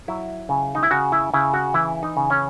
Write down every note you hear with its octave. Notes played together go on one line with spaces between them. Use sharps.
F#3 E4
C#3
D#4
E4
C#3 F#4
E4
C#3 E4
F#4
E3 E4
D#4
C#3
C#4